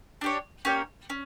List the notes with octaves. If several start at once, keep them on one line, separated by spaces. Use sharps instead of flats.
D4 G4 C#5
A#3 C#4 G4 C#5
C#4